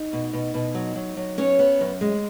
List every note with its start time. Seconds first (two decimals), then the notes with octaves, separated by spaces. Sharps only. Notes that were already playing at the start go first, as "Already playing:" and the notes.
Already playing: D#4
0.13 B2
0.33 B2
0.54 B2
0.75 F#3
0.96 F#3
1.17 F#3
1.38 B3 C#4 C#5
1.59 B3
1.81 F#2
2.01 G#3